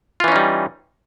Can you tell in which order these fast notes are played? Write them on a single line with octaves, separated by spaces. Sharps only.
F4 E3 C#4 D#4 G3